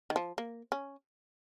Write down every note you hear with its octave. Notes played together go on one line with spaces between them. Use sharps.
D#3
F3
A#3
C#4